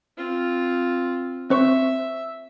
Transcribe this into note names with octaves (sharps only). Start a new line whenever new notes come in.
C4 F4
C4 C5 E5 C#6